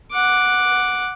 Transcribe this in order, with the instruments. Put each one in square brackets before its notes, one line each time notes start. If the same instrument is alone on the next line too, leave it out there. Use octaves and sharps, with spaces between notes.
[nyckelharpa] F#5 D6